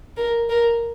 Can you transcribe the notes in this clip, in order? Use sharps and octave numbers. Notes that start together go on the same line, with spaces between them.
A#4
A#4